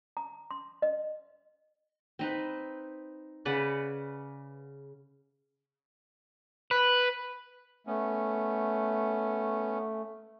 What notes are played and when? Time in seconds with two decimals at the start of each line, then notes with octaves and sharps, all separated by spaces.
0.17 A#5
0.51 C6
0.82 D#5
2.19 C4 D#4 B4
3.45 C#3 B4 D5 F#5
6.71 B4
7.87 A3 B3 C#4